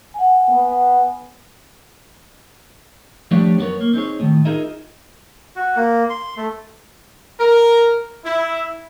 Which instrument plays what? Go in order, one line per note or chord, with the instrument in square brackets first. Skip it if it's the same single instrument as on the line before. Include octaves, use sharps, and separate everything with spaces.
[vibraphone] F#5 G#5
[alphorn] B3
[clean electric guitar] F3 G3 A3 D4 G4 C#5
F#2 B3 F#4 A#4 C#5
A#3
C4 D#4 G#4 C#5
A2 D#3
D#4 F4 G#4 A#4 D#5 E5
[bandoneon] F#4
A#3
C6
A3
[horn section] A#4
E4